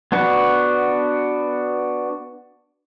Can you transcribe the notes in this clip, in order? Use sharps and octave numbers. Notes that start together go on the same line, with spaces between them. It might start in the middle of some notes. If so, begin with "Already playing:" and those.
B3 D4 F#4